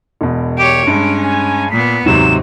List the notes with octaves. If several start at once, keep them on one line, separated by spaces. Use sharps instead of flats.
E1 B2
G4 C#5 D7
G2 G#3 C#4
G#5
A#2 B3 B6
D#2 G#2 C3 F#3 E7